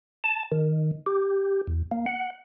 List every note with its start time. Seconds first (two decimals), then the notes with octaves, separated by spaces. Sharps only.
0.24 A5
0.52 D#3
1.06 G4
1.67 E2
1.91 A#3
2.06 F#5